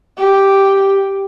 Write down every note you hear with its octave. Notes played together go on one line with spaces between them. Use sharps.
G4